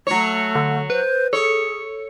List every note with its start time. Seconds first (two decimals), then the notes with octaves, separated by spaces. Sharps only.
0.07 F#3 A3 C#5
0.55 D3
0.90 B4 C5
1.33 G#4 A4 C#5